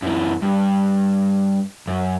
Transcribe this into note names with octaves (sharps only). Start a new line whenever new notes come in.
F#2 E3
G2
F#2